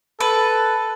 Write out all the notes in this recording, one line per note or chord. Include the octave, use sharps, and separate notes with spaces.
A4 B4